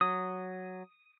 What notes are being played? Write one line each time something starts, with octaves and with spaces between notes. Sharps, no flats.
F#3 D#6